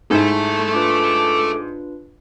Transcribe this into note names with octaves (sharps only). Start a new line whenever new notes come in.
G#2 D#4 E4 A4 E5
D4 F4 B4 D6